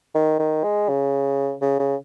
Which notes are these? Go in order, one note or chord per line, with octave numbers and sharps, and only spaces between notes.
D#3
D#3
G#3
C#3
C#3
C#3